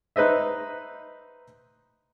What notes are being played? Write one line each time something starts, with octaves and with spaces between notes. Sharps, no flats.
D#4 B4 C5 D#5 E5